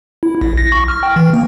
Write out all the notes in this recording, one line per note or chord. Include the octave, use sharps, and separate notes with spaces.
E4
A#1
A#6
C#6
F6
G5
E3
A#3